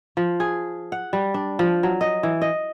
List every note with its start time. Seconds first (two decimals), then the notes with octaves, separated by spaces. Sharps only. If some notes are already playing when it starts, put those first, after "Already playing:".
0.17 F3
0.40 G#4
0.92 F#5
1.13 G3
1.34 D4
1.59 F3
1.83 F#3
2.01 D#5
2.23 E3
2.42 D#5